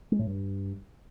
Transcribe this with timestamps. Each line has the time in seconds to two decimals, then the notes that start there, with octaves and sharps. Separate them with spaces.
0.12 G#3
0.19 A2
0.27 G2